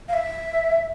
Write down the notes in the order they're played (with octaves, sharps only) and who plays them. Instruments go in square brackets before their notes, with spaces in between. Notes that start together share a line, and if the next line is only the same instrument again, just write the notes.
[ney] F5
E5